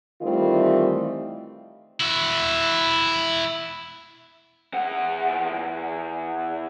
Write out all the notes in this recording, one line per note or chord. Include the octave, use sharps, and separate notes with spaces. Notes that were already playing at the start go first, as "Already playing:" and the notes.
D#3 E3 G3 A3 C4 F4
E4 F#4
E2 F#5